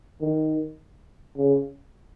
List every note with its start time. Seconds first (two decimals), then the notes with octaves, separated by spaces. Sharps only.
0.21 D#3
1.37 C#3